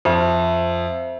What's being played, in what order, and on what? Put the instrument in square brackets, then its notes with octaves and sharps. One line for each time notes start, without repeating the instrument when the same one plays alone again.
[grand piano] F2 [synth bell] C5 E5